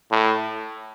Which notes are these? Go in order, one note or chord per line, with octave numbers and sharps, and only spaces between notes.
A2